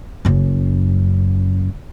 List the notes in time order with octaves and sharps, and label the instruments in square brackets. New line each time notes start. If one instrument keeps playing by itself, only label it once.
[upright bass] F#1 F#2